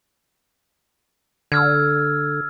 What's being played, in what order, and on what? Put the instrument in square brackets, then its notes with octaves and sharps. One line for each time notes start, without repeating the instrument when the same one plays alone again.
[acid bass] D3 [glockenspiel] E6 F6 G#6